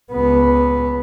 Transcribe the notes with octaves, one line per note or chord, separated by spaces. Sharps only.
C#2 B3